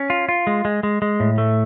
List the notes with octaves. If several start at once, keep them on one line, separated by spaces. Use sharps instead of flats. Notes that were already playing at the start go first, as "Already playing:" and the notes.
Already playing: C#4
F4
F4
G#3
G#3
G#3
G#3
A2
A3